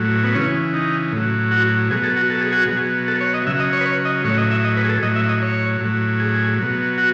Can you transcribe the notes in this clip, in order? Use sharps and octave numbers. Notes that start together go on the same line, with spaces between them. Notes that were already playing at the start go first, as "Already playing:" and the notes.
Already playing: A2 F#3
B3
C#3 E3 C#4
D#4
A2 F#3
F#4
B2 F#3 G#4
A4
F#4
A4
G#4
F#4
G#4
B2 F#3
A4
C#5
D#5
C#3 F#3 E5
D#5
C#5
B4
C#5
D#5
A2 F#3 C#5
D#5
E5
D#5
B4
G#4
A4
A2 F#3 D#5
E5
D#5
C#5
A2 F#3
G#4
B2 F#3
F#4